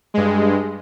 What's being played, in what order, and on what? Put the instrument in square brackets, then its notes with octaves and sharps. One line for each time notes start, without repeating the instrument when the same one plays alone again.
[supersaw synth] G2 G#3